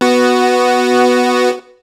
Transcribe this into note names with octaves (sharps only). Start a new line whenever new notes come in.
B3 F#4